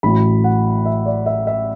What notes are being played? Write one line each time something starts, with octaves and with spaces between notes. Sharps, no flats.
A1 A2 F#3 B5
F#5
E5
D5
E5
E5